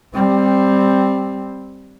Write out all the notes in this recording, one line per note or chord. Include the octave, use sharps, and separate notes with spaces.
G3 C4